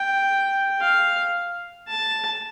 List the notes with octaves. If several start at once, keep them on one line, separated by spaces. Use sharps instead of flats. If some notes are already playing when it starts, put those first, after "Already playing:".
Already playing: G5
F5
A5